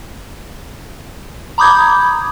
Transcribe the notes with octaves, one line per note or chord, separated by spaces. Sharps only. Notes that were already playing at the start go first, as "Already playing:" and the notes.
A#5 B5 D6 D#6 G6 G#6